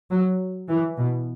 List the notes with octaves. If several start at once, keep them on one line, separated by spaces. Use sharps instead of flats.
F#3
E3
B2